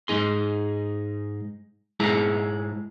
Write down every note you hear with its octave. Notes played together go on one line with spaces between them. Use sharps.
G#2 B2 D#4 G#4 C6
G#2 G#3 E4 G#4 A5 A#5